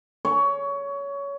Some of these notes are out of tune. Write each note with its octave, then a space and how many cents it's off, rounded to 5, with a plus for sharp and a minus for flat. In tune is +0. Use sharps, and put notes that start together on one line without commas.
C#5 +20